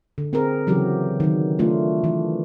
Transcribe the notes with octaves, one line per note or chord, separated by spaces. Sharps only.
D3
C4 G#4 A#4
C#3 E3 F#3 C#4 G4
D#3 F#3
D#3 A3 D4 F4 A#4
E3